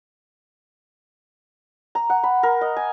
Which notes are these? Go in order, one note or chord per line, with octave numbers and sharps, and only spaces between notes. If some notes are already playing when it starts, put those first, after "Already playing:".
A#5
F#5
B5
A#4
D#5
G#5